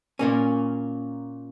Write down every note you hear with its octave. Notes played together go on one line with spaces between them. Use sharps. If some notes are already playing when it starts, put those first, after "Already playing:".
A#2 A#3 C#4